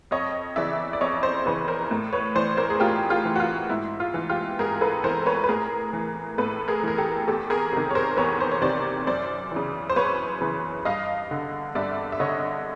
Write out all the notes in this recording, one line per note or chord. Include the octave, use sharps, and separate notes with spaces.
F2 C#5 D#5
C#3 E3 D5 E5
D5
F2 C#5 D#5
C5 D5
C#3 E3 B4 C#5
A#4 C5
A2
B4 C#5
E3 C5 D5
A#4 C5
G#4
A2 F4 G4
F4 G4
E3
F#4
F4
G#2 E4
F4
E3
F4 G4
G#2 G#4 A#4
A4 B4
E3 A#4 C5
B4 C#5
B4
A2 G#4 A#4
E3
A2 A4 B4
G#4 A#4
E3 A#4
G4 A4
E2 G4 A4
G#4 A#4
C3 D#3
C#5
A#4 C5
E2 B4 C#5
C5
C#5
C3 D#3 C5 D5
F#2 C5 D5
C#3 E3
C5
F#2 B4 C#5
C#3 E3
G2 D#5 F5
D3
G2 D5 E5
E5
D3 C#5 D#5